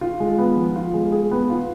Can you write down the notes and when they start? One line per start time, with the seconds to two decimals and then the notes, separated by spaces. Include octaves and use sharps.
0.01 F4
0.20 G#3
0.38 B3
0.57 F3
0.76 F4
0.94 G#3
1.12 G#4
1.31 B3
1.50 F4